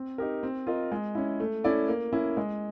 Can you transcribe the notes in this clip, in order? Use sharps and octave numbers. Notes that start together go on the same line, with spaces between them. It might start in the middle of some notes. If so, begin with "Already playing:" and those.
Already playing: C4
D#4 G4 A#4
C4
F4 A#4 D#5
G#3
C#4 E4
A3
C#4 E4 A4 D5
A#3
C#4 E4
G#3